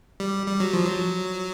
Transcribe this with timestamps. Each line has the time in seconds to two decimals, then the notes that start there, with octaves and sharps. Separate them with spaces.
0.20 G3
0.47 G3
0.60 F#3
0.73 F3
0.86 F#3